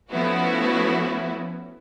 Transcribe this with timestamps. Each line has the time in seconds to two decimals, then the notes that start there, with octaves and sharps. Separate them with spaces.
0.11 F3 A3 B3 C#4 E4 F#4